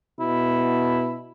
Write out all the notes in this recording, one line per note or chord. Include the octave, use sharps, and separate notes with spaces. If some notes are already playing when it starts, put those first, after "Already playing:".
B2 E4